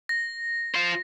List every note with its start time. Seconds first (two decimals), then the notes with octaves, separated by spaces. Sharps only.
0.09 A#6
0.75 F4 C5